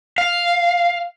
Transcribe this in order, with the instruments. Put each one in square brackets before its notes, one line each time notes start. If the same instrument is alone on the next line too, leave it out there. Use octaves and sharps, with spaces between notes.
[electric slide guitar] F5